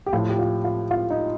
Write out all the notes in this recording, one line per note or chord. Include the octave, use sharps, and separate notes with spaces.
G4
A2 F3 F4
G4
F4
F4
F4
D#4